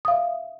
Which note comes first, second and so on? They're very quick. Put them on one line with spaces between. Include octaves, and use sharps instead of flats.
D#6 F5 E5